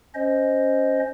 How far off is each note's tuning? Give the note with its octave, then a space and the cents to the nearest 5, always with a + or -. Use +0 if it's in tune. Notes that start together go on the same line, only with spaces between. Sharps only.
C#4 +0 C5 +0 D#5 +0